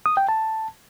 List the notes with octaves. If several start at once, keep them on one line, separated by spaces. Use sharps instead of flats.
D#6
G5
A5